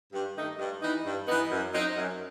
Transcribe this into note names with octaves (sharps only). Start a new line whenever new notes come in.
G2
D#3 A3 D#4
G2
E3 B3 D#4
G2
E3 B3 D#4
F#2
F#3 C4 D#4
F#2